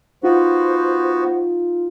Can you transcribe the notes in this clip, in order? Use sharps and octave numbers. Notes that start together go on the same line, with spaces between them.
B3 D#4 F4 F#4 C5